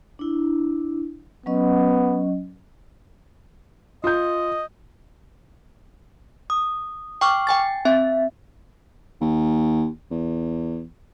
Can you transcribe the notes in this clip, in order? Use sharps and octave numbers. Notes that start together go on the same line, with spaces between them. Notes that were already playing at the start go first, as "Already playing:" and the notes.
D4 E4
F#3 B3 C#4 D#5
F4 D#5 G6
D#6
G5 C#6 D6 F6
G5 G#5 A6
C4 E5
D#2
E2